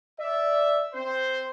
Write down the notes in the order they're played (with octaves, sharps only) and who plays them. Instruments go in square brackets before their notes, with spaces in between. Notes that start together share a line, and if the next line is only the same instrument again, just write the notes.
[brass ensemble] D5 E5
C4 C5